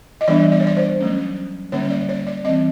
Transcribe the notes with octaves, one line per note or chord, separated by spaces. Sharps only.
D#5
E3 G3 B3 D4 D5
D5
C#5
D5
C5
F#3 A3 C#4
D3 G3 A#3 C#4 C#5
C#5
D5
C#5
D5
E3 G3 C4 D#5